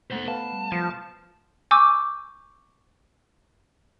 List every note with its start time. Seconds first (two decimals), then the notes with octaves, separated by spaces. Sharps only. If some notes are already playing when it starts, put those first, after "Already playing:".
0.11 B2 A3 B3 C5 F#5
0.28 B4 F5 F#5 A5
0.53 G3
0.72 F3 A5
1.71 G#5 C#6 D6 E6 G6